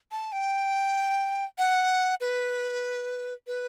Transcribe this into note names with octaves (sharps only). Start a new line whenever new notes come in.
A5
G5
F#5
B4
B4